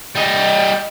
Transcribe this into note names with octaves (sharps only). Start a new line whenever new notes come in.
G3 D#5